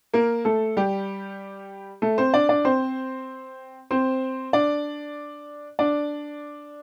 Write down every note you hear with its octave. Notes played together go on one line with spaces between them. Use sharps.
A#3 A#4
A3 A4
G3 G4
A3 A4
C4 C5
D4 D5
D4 D5
C4 C5
C4 C5
D4 D5
D4 D5